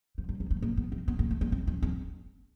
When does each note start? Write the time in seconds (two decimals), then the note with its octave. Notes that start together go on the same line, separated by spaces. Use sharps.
0.18 F3
0.29 F#3
0.40 G3
0.51 A3
0.62 A#3
0.77 B3
0.92 C4
1.08 B3
1.19 A#3
1.31 A3
1.41 A#3
1.52 C4
1.67 C#4
1.83 C4